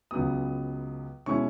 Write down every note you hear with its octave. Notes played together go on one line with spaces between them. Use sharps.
C#2 C#3 F#3 B3 D#6
B2 G#3 C#4 E4 C#6